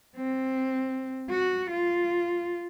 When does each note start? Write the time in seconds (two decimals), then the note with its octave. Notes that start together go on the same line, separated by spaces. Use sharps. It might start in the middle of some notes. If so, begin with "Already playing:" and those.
0.16 C4
1.30 F#4
1.71 F4